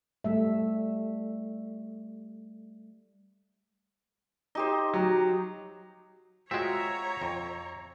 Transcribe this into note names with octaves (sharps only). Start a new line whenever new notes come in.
G3 A3 E5
D#4 G4 C5
F#3
G#3 C4 F4 F#4 C#5 E5 G5 A#5
F2